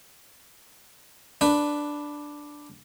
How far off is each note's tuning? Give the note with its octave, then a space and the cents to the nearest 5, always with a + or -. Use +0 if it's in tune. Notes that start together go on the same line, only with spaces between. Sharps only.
D4 +0 B4 +0